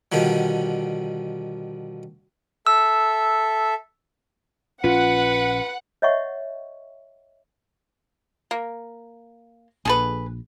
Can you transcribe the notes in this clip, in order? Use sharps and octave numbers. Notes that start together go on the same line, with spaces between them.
B2 D3 D#3 F3 G3
A4 E5 E6
A#1 C#4 F4 B4 F#5
C#5 D#5 E5 F#5 C#6
A#3
A#1 G#4 A4 B4